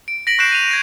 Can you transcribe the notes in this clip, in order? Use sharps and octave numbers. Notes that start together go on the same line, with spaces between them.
D7
A#6 B6 D7 F#7
C#6 F#6 G6 C7 D7 E7
D#7 F7
G#6 A#6 C7